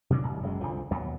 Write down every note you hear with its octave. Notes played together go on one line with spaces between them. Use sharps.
B2 E3 F#3 D4
D1 G1 C2
F#1 F#2 G#3
C2 D3 F3
D#2 B2 F#3